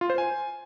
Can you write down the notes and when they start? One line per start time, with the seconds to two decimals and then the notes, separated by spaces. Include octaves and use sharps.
0.01 F4
0.10 C5
0.18 G#5